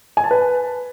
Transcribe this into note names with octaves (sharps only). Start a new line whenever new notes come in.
G#5
A5
B4